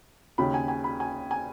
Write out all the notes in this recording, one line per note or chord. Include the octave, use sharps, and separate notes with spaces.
D#2 C#3 B5
G#5
G#5
B5
G#5
G#5